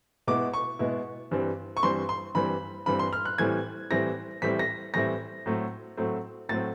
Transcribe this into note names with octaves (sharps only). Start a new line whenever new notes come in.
B2 G#3 B3 E4 D6
C#6
B2 G#3 B3 E4
G2 E3 G3 C4
C#6
G2 E3 G3 C4 C6
C6
G2 E3 G3 C4 B5
G2 E3 G3 C4 B5
C6
F6
F#6
A2 E3 G3 C4 E4 G#6
A2 E3 G3 C4 E4 A#6
A2 E3 G3 C4 E4 B6
A#6
A2 E3 G3 C4 E4 A#6
A2 F#3 A3 C4
A2 F#3 A3 C4
A2 F#3 A3 C4 A6